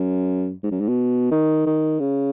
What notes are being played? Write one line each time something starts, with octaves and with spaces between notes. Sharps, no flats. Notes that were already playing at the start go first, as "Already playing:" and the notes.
Already playing: F#2
G#2
F#2
G#2
B2
D#3
D#3
C#3